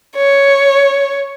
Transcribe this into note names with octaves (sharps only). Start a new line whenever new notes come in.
C#5